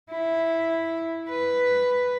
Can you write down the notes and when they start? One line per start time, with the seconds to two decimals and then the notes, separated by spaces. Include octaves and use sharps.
0.11 E4
1.29 B4